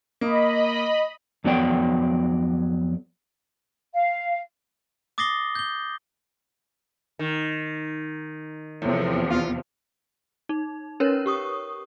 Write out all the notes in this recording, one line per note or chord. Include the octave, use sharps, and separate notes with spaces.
A#3 D#5 B5
F2 F#3 B3 D5 G5
F5
D6 D#6 A6 A#6 C7 G7
G6 G7
D#3
E2 A2 C3 F3
F4
D#4
C#4 A#4 B4 C#5
G4 C#6 D#6